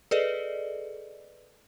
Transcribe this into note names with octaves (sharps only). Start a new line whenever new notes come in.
G#4 A4 B4 D5 D#5